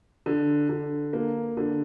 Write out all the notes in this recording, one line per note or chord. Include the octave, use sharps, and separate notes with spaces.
D3
D3
A#3
D3